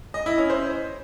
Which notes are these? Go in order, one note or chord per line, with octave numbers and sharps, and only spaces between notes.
D#5
E4
C#4
C5